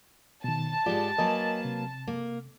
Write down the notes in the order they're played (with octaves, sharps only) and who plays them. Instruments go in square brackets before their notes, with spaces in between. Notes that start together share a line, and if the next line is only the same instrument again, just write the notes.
[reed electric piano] B2 D#3 [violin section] A5
[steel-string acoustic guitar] G#2 G#3 G4 [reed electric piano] F4 G#4 D5
[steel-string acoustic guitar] F#3 A#3 B4 [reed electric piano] A#4 D#5 G#5
[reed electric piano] C3
[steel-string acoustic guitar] A#3